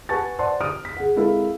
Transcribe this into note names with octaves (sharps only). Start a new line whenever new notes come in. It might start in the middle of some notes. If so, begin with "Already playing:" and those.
B4 F#5 G#5 A5 C#6 A6
C5 D5 F#5 A5 C6
D#6 F6 D7
B6
G#4 F#5
G#3 C4 E4 A4 A#4 F5